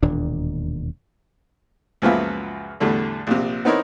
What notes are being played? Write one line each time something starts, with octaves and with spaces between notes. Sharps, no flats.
E1 D#2 A#2 D4
C#2 F#2 F3 A#3 B3 E5
E2 A2 D3 G3 A3
A#1 C3
B3 C4 D#4 E4 A#4 C#5